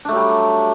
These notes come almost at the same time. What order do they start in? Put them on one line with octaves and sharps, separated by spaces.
D4 A3 F#3 G3